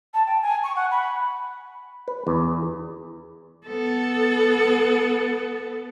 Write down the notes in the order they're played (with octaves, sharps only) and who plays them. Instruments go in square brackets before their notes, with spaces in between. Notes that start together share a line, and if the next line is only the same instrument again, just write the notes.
[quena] A5
G5
G#5
C#6
F#5
B5
[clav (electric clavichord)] B4
E2
[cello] B3 A4